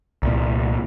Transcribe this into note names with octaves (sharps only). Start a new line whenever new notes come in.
C2 A#2